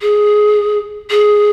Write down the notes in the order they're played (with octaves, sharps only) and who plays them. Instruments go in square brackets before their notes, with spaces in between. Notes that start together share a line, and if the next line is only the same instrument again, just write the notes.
[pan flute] G#4
G#4